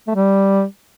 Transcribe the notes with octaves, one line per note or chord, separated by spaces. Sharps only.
A3
G3